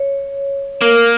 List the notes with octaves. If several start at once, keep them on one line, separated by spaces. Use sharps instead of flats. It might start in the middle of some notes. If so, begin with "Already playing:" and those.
Already playing: C#5
A#3 A#4